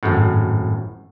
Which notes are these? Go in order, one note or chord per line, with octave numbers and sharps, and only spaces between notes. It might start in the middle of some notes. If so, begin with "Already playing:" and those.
G#1 F#2 A2